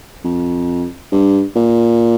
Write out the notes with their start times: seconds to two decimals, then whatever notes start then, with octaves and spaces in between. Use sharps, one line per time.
0.24 F2
1.12 G2
1.56 A#2